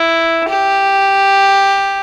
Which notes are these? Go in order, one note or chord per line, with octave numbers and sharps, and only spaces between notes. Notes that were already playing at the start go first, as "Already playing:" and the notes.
Already playing: E4
G4